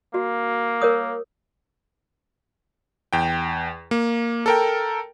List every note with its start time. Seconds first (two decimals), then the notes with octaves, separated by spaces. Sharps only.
0.14 A#3 F#4
0.81 A#4 C#5 D#6
3.13 E2 G5
3.91 A#3
4.46 A4 A#4 G5